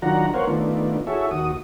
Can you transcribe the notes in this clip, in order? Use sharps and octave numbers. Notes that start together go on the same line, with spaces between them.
D#3 F#3 D4 F4 F#5 A#5
B3 A#4 C5 C#5 F5 F#5
D#3 A3 B3 D4 F4
E4 F#4 G#4 A4 C#5 E5
D#2 F#4 D#6